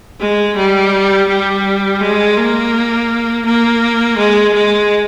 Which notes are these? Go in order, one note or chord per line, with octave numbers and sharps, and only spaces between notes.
G#3
G3
G3
G#3
A#3
A#3
G#3
G#3